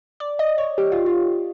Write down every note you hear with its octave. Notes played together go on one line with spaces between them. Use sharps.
D5
D#5
C#5
G4
F4
F4